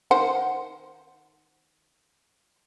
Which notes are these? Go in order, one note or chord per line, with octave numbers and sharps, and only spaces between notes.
D#3 C5 F#5